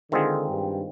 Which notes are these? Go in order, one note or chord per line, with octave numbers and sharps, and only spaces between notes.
D3 D#3 G#3 C4 F4 G#4
G2